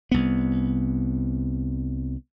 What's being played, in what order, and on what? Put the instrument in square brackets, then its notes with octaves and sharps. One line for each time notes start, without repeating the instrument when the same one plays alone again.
[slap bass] C2 B3